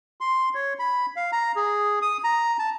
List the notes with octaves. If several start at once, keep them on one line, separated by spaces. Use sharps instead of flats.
C6
C#5
B5
F5
A#5
G#4
D#6
A#5
A5